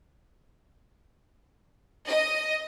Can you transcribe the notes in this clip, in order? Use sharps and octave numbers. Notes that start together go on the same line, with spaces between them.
D#5